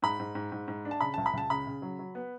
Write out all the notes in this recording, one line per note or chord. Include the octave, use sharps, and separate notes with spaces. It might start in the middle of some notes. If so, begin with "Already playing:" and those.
G#2 B5
G#2
G#2
G#2
G#2
D4
A5
C#3 B5
C#2 A5
B5
C#2 A5
C#3 B5
C#3
F#3
F#3
B3